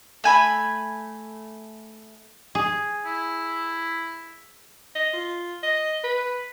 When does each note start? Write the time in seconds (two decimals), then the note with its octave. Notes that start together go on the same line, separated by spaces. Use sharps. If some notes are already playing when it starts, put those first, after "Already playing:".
0.24 A3 G#5 B5
2.55 G#4
3.05 E4
4.95 D#5
5.13 F4
5.63 D#5
6.04 B4